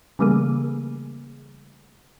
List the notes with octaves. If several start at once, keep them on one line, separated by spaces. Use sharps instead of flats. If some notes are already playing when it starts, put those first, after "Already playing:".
C#3 E3 G3 A3 A#3 G#4